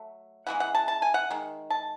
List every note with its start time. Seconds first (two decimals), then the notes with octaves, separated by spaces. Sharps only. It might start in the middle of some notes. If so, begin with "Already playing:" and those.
Already playing: F#3 A3
0.47 C#3 E3 G#3 B3 F#5
0.60 F#5
0.75 A5
0.88 A5
1.02 G#5
1.14 F#5
1.30 D#3 G#3
1.70 A5